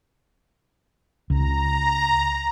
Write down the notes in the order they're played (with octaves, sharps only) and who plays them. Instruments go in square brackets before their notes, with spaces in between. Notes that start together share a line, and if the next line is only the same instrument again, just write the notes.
[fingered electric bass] C#2 [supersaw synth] A#5